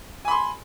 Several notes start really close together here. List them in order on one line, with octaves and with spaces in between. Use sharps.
G#5 B5 C6